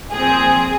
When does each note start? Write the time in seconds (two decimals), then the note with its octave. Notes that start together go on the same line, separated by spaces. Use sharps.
0.12 A#2 F3 C4 G#4